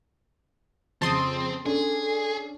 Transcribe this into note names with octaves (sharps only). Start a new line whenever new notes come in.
F2 C#3 C4 A5 C6 D#6
C#4 D4 G#4 A4